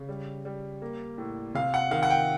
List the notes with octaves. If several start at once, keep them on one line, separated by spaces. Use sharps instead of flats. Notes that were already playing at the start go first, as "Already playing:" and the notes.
Already playing: C#3
G3
G3
A#3
A2
C3 F5
F#5
D#3 F5
F#5
G5